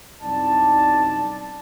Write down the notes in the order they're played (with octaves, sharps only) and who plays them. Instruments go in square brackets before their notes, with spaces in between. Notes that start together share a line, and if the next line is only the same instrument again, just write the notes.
[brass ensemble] C2 F#2 D#4 D5 A5